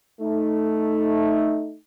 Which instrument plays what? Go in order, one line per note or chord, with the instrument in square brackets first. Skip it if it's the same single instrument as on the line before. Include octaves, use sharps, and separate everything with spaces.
[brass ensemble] A3 D#4